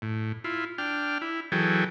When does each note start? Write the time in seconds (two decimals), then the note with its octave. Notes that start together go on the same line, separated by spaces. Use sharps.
0.02 A2
0.44 E4 F4
0.78 D4 G5 F6
1.21 E4
1.52 E3 F#3 G#4 A4 G5